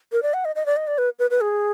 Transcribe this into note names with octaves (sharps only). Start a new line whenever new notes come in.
A#4
D5
F#5
D#5
D#5
D5
D#5
D5
B4
B4
B4
G#4